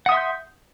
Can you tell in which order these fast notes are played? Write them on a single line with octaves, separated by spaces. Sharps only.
F#5 D#6 E5 C6 G6